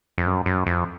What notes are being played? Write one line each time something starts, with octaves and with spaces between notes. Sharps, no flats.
F2
F#2
F#2
F2